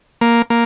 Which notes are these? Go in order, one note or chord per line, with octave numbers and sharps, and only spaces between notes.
A#3
A#3